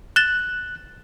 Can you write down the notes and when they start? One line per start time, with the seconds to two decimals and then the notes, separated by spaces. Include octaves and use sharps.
0.16 F#6 A6 E7 G7